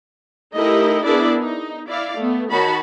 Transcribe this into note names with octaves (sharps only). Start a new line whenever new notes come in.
A3 D#4 E4 G4 A#4 D#5
B3 D4 E4 G#4 A#4 D5
D#4
E4 D5 F5
A3 B3
D#3 D#4 F#4 C#5 A5 B5